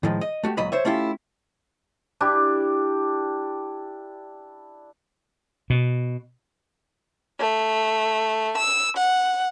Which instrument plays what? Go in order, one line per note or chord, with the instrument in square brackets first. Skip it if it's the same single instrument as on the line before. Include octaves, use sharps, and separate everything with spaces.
[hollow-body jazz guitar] A2 D#3 F3 G#3
D#5
A3 F#4 G4
C#2 A#2 F#3 D#5 B5
C5 C#5 E5
A3 C#4 E4 F4 G4
[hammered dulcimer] D4 E4 G4
[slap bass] B2
[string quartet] A3
E6
F#5